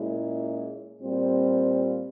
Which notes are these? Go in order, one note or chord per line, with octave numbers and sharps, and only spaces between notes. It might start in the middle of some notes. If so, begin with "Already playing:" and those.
Already playing: A#2 G#3 C#4 E4
A#2 G3 C4 F4